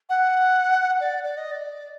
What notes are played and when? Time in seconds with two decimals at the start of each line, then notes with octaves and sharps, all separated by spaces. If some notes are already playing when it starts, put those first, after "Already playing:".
0.09 F#5
1.00 D5
1.24 D5
1.37 D#5
1.51 D5